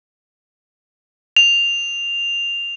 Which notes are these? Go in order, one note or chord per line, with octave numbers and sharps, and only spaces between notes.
F7